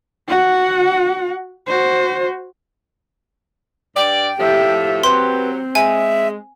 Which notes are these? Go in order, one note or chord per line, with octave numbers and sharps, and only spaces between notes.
F#4 F#5
F#4 C5
G2 D5 G5
A2 F3 G4 E5
F#3 C4 G4 B4 C6
G#3 E5 G#5